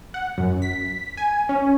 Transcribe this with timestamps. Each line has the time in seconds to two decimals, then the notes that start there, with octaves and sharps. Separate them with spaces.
0.14 F#5
0.38 F#2
0.62 B6
1.17 G#5
1.49 C#4